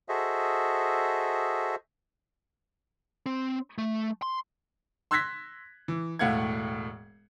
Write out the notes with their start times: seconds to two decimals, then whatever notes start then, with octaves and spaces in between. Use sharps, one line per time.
0.09 F#4 G#4 A4 C5 D#5 E5
3.26 C4
3.78 A3
4.22 C6
5.11 C6 E6 F#6 G#6 A#6 B6
5.88 E3
6.19 E1 A2 A3 F5 F#5 G#6